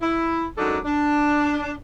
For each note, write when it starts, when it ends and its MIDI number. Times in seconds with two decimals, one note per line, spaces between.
0.02 0.46 64
0.58 0.79 42
0.58 0.79 54
0.58 0.79 56
0.58 0.79 62
0.58 0.79 63
0.58 0.79 69
0.85 1.73 62